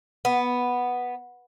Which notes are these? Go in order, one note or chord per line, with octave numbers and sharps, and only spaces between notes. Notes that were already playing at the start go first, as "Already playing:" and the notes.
B3